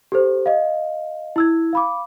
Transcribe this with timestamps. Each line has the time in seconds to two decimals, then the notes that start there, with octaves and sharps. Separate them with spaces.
0.12 G4 A4 C5
0.46 D#5 F5
1.36 E4 E6 G#6
1.73 F5 B5 D6